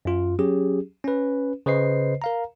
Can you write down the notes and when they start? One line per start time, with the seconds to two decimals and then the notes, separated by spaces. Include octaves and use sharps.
0.05 F#2 F4
0.39 F#3 C#4 G4 G#4
1.04 C#4 B4
1.66 C#3 B4 C5 D#5 C7
2.22 A#4 F5 A#5